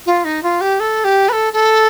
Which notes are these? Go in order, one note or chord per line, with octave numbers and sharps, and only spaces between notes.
F4
D#4
F4
G4
A4
G4
B4
A4
A4